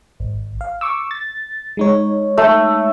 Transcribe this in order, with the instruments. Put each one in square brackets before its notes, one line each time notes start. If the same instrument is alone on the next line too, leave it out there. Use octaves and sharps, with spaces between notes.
[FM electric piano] G#1
F5
C#6 D6 E6
A6
G#3 D#4 C#5
[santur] A3